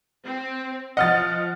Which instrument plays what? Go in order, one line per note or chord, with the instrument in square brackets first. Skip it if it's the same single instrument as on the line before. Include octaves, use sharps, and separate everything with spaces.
[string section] C4
[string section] F3 [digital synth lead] D#5 [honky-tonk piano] F#5 F6 A6